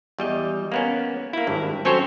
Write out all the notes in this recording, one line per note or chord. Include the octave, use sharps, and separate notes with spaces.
E2 G3 D#5
A#3 B3 C#4
A#3 E4
G#1 G2
F#3 C4 C#4 A4 C5 C#5